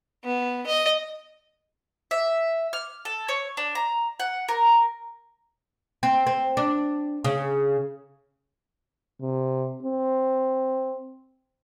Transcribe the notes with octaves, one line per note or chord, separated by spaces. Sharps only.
B3
D#5
E5
F6
A4
C#5
D4
A#5
F#5
A#4
C4
C4
D4
C#3
C3
C4